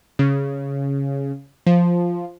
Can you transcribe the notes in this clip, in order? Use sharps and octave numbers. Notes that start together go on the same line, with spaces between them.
C#3
F3